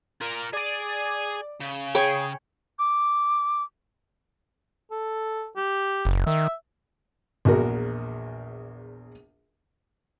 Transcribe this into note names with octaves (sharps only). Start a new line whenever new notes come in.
F4 A#4 A#5
G#4 D5 G#5
C#3
G#4 C#5 G5 B5
D6
A4
G4
F#1
D#3 E5
A#1 E2 F#4 A#4